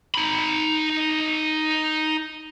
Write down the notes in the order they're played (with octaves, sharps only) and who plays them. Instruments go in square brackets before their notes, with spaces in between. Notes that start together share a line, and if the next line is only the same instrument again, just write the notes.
[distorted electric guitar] D#4 B5